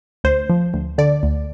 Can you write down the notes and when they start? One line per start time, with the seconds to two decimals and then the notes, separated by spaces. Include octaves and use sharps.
0.24 D2 C5
0.49 F3
0.74 D2
0.98 D3 D5
1.23 D2